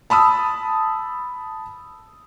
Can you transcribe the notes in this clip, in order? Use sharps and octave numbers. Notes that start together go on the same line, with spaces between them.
A5 B5 D#6 E6